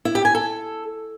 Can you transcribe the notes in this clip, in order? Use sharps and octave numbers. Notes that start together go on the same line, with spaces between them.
E4
G4
G#5
A4